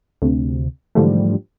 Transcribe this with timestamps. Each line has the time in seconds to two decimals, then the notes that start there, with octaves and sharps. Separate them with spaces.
0.22 D2 C3
0.95 G#2 D3 E3 F3 G3 A3